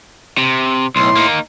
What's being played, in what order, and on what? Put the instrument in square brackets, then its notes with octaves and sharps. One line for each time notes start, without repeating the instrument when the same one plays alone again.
[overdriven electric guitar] C3
[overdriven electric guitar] B1 [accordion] A2 C6
[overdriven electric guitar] A#3 D#4